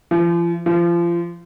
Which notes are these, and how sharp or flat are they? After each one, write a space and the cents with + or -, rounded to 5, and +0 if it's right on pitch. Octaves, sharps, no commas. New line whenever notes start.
F3 -40
F3 -30